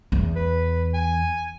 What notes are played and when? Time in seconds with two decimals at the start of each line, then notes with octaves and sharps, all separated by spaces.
0.12 E2
0.36 B4
0.94 G#5